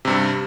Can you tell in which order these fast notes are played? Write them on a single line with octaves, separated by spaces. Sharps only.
C3 G2 G3